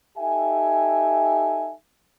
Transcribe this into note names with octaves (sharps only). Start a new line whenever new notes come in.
D#4 G4 A4 E5 G5 G#5